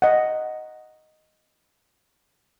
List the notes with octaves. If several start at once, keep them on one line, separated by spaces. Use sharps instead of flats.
D#5 F#5